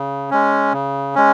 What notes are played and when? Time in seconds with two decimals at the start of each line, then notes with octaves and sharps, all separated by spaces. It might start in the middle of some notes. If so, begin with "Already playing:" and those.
Already playing: C#3
0.31 G#3 C#4
0.72 C#3
1.15 G#3 C#4